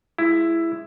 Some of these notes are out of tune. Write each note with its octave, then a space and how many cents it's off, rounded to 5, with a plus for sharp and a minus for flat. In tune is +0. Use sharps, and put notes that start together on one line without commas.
G#3 +0 E4 +10